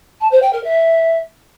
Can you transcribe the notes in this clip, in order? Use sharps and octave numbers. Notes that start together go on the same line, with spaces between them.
A5
C5
G5
A#4
E5